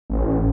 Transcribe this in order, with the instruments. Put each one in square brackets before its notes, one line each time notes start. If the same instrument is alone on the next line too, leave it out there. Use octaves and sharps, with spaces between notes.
[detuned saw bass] A1